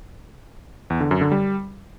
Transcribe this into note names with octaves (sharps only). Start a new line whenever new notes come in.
E2
D3
F#2
D3
G3